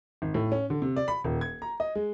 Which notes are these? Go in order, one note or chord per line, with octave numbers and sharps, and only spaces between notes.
G#1
A2
C#4
D3
C3
D5
B5
D#1
G#6
A#5
D#5
G#3